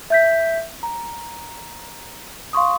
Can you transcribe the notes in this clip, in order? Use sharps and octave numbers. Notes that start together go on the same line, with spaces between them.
E5 G6 B6
A#5
F5 C6 C#6 D#6